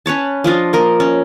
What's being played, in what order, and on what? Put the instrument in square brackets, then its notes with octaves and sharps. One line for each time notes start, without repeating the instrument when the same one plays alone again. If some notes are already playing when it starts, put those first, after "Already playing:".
[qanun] C#4 B4 C#5 A5
F3 D4 F4 D#5
A#3 A#4 D#5
C#4